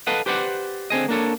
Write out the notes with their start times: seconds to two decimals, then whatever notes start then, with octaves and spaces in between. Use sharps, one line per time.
0.07 A4 B4 D#5 F5 F#5
0.26 G4 B4 C5 D5 F#5
0.90 D3 C4 G#4 D#5
1.09 A#3 D4 A4 C#5